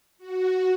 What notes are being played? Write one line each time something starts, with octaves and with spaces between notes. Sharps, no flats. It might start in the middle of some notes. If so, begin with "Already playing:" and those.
F#4